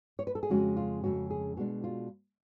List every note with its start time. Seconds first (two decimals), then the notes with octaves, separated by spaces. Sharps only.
0.19 C#5
0.27 B4
0.35 A4
0.43 G#4
0.50 F2 C#3 G#3 C#4 F#4
0.77 F4
1.03 F2 C#3 G#3 C#4 F#4
1.30 G#4
1.57 B2 G#3 D4 F#4
1.84 F4